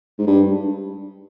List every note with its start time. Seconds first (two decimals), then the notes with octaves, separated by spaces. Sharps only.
0.18 G#2
0.27 G2